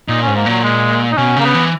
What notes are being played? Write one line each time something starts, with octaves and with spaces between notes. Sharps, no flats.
A#2 D#4
G#2 C#4
A#3
A#2 F#3
G#3
D#4
B2 C#4
C#3 A#3
B3
E3